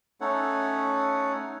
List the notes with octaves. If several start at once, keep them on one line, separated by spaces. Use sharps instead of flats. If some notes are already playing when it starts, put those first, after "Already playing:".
A3 C#4 D#4 A4 C#5 F#5